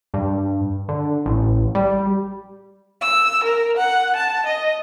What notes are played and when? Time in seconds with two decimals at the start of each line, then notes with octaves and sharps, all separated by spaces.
0.14 G2
0.88 D3
1.26 A1
1.75 G3
3.02 E6
3.43 A#4
3.77 F#5
4.16 A5
4.46 D#5